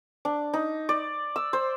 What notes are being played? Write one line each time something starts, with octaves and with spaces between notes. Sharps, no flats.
D4
D#4
D5
E6
C5